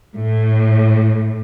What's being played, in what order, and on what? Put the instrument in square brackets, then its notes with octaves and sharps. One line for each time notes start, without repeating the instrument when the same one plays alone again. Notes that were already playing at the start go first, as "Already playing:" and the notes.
[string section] A2